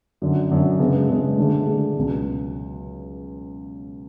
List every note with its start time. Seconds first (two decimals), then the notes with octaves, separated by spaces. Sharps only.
0.22 F#2 D3 F#3
0.51 F#2 D3 F#3
0.79 C#3 G#3 B3 D4
1.09 C#3 G#3 B3 D4
1.37 D3 A3 D4 G#4
1.66 D3 A3 D4 G#4
1.96 C#2 B2 F#3